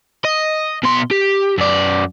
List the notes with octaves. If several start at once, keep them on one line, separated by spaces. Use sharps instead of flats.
D#5
B2 C6
G4
F#2 D5